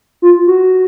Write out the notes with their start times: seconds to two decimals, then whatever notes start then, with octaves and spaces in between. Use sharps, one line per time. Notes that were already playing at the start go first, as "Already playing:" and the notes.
0.22 F4
0.47 F#4